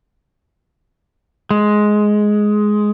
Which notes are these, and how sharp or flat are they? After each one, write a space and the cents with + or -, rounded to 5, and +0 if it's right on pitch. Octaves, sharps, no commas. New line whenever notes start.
G#3 +10